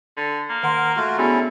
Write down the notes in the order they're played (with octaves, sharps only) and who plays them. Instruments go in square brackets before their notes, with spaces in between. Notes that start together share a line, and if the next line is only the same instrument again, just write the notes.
[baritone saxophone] D3
A#3
[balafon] D#3 F#5 C6 [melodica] A#4
[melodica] A3 F4 F#4
[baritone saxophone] D3 [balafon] B3 F#4 G#4 [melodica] C#4 E4